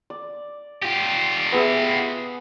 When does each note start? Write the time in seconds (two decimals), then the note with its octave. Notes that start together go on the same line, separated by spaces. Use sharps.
0.10 D5
0.82 F4 G4
1.52 B3 G#4 E5